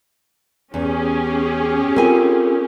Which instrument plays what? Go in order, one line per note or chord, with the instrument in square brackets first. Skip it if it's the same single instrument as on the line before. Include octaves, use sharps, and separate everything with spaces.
[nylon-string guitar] E2 [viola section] C#4 G4 G#4
[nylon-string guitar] C4 G#5 [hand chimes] F4 A4 A#4